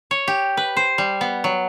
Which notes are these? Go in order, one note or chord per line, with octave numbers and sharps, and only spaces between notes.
C#5
G4
B4
C5
G3
B3
F#3